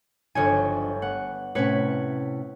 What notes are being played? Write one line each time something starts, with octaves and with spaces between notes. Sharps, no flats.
G1 F3 D4 D#4 C#5 G#5
B3 F#5
A2 C3 C#4 B4 C#5 C#7